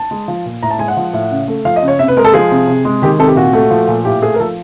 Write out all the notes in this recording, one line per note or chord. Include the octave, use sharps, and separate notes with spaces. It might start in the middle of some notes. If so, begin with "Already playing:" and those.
Already playing: A5
G#3
F3
A#2
A2 A#5
A5
G#3 G#5
F#5
F3
A2
C#3
A3
F3 F5
D#5
C#3
C#5
C3 E5
B4
G#3 A#4
A4
F3 G#4
C3
C3
G#3
D#3 G4
C3 A4
G4
A#2 F#4
A3
F3
A#2
A2 G4
A3 G#4
A#4
F3 A4